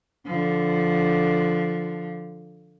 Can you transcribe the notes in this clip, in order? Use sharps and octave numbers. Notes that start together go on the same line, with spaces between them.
D3 F3